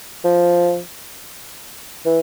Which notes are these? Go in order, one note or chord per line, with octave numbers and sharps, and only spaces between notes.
F3
E3